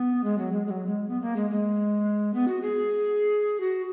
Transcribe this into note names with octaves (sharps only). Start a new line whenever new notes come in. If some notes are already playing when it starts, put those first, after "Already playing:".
Already playing: B3
G#3
F#3
G#3
G#3
F#3
G#3
B3
A#3
G#3
G#3
B3
F#4
G#4
F#4